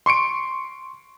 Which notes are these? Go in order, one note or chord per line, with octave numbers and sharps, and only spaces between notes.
C6 C#6 C#7 D7